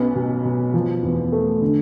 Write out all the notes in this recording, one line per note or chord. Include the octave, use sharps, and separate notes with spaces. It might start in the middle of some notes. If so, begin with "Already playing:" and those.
Already playing: B1 B3 C#4
B2
B2
F3
E2
A3
D3